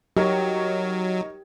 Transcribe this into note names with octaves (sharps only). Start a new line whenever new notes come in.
F#3 D#4 G4 A#4 C#5